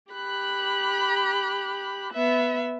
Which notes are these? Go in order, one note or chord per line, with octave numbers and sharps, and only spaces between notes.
G4 B5 F#6
B3 E5